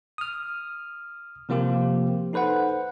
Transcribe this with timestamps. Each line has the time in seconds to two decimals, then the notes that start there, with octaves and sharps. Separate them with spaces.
0.18 D#6 F6
1.49 C3 F3 A#3 F4 G4
2.33 D#4 A4 B4 C5 F#5